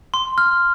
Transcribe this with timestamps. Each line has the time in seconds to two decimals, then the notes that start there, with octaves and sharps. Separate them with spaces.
0.14 C6
0.38 F6